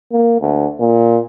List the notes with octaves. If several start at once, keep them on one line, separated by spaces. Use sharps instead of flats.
A#3
D2
A#2